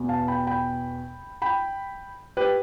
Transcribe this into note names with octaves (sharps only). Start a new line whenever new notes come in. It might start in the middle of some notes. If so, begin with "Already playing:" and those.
Already playing: E2 B2 B3
F5 A5
G5 B5
G5 B5
G5 B5
G4 B4